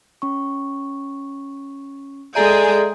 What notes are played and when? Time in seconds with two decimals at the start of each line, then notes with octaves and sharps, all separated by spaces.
0.22 C#4 C#6
2.35 G#3 G#4 A4 D5 E5 G5 A#5